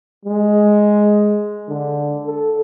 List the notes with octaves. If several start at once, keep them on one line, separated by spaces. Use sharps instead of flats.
G#3
D3
A4